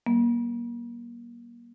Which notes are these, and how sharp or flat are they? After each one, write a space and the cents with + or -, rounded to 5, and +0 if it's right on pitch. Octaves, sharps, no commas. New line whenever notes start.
G3 -30 A#3 +30